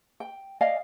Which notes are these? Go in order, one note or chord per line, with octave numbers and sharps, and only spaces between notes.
G5
D5 D#5 F5 G#5